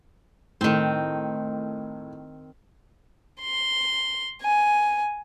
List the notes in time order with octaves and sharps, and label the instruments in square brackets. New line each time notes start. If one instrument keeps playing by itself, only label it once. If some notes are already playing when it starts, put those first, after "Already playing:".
[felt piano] A2 [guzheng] D#3 C4
[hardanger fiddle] C6
G#5